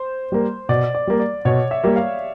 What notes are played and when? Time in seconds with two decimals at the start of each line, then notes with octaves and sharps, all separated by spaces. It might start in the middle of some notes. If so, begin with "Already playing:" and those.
Already playing: C5
0.32 G3 A#3
0.69 B2 D5
0.95 D5
1.07 G3 A#3
1.20 D5
1.45 B2 C#5
1.71 E5
1.84 G3 A#3
1.96 F5